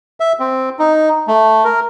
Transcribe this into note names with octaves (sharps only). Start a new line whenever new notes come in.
E5
C4
D#4
A3
A#4